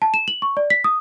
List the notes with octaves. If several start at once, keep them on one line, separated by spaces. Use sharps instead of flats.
A5
E7
F#7
C#6
D5
B6
D#6